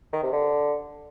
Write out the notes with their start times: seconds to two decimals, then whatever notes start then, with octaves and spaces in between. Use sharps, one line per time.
0.13 D#3
0.23 C3
0.32 D3